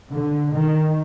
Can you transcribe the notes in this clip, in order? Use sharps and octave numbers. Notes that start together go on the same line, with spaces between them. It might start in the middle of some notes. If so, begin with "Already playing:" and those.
D3
D#3